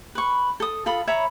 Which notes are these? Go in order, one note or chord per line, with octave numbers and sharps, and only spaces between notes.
B4 C#6
A4 D#6
F4 A4 B5 D#6
C#5 E5 A#5 B5